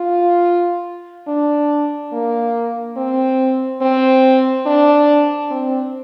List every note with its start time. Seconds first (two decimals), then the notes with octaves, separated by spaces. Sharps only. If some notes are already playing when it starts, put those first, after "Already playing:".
Already playing: F4
1.28 D4
2.13 A#3
2.97 C4
3.81 C4
4.66 D4
5.51 C4